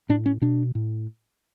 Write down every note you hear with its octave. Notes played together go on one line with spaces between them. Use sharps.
A2 D4
C#4
B2 D4
A2